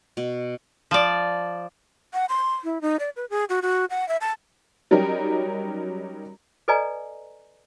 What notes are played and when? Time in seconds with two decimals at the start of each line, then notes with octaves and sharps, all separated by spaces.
0.17 B2
0.91 F3 D5
2.14 F#5
2.29 C6
2.64 E4
2.81 D#4
2.99 D5
3.16 B4
3.30 G#4
3.49 F#4
3.62 F#4
3.90 F#5
4.08 E5
4.21 A5
4.91 F#3 G3 C#4 D#4 G4 A#4
6.68 A4 B4 D5 D#5 G#5 A#5